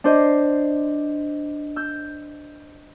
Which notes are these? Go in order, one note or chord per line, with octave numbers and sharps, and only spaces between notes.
D4 C5 D#5
E6 G6